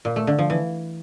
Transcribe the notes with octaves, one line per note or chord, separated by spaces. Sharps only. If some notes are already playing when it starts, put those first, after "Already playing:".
A#2
A3
D3
F3
E3